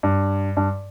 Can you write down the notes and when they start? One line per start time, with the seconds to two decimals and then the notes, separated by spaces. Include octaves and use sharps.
0.03 G2
0.57 G2